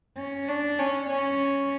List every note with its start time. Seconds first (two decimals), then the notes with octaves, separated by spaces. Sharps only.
0.18 C#4
0.48 D4
0.79 C#4
1.09 C#4